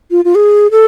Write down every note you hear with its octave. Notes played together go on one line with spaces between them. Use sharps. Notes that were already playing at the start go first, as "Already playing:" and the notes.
F4
F4
G#4
A4